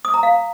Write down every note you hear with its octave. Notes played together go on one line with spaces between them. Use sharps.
D#6
A#5
F5